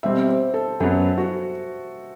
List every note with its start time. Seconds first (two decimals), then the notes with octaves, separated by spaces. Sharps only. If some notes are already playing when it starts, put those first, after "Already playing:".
0.03 B2 G3 C4 G4 E5
0.29 C5
0.54 A4
0.80 F#2 F#3 B3 A4
1.17 F#4